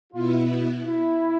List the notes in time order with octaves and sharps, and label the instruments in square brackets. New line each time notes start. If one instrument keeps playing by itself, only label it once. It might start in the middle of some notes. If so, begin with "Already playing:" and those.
[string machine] B2 B3 E4 [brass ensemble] F4
[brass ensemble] E4